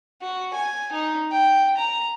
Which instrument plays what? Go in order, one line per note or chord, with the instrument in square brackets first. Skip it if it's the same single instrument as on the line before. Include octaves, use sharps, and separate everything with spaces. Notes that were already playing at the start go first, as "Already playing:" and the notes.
[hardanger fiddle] F#4
G#5
D#4
G5
A#5